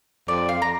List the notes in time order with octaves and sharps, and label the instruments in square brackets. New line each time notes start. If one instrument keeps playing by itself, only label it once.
[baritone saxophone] F2 [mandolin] D5
[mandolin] F5
A#5